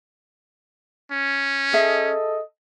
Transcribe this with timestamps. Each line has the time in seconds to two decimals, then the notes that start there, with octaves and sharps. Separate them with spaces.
1.12 C#4
1.73 G#4 A4 D#5 E5